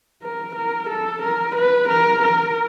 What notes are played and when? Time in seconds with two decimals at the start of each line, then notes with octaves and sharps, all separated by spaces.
0.23 A#4
0.55 A#4
0.89 A4
1.22 A#4
1.55 B4
1.88 A#4
2.22 A#4